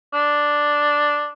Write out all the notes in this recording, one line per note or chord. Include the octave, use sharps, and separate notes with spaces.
D4